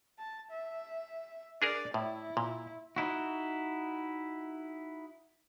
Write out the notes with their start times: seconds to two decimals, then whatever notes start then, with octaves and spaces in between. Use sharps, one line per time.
0.18 A5
0.51 E5
1.62 D4 G#4 A#4 D5
1.94 A2 E4
2.37 A#2
2.96 D#4 E4 F#4